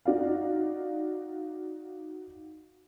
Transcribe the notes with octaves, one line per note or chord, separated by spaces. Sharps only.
D#4 F#4 D5 F5